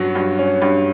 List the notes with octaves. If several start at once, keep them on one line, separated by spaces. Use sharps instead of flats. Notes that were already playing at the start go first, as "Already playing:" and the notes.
Already playing: G2 F#3 C#4
G2
C#4
G2